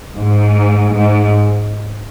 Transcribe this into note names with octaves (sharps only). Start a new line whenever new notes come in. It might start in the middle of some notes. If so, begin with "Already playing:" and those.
G#2
G#2